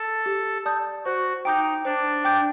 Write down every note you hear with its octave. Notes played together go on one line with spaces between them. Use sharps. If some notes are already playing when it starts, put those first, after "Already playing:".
Already playing: A4
G4
D5 A5 D#6 G6
F#4 C5
D#4 G5 D6 G6
D4 C5
G5 D6 G6